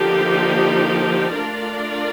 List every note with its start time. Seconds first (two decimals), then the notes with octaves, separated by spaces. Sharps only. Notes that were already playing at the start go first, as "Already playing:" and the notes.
Already playing: D3 F3 A#3 D#4 G4
1.32 A3 D4 F4 A#4 D5